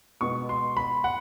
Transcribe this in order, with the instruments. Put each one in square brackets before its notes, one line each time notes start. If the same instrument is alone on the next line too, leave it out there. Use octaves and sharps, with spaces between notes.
[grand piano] B2 G#3 B3 C#6
C6
B5
F#5